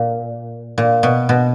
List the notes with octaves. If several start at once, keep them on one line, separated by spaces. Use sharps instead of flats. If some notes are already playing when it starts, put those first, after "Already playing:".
Already playing: A#2
A#2
B2
B2